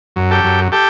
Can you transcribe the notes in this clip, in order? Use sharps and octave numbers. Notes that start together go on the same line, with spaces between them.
F#2
G4 A4
F#2
G4 A4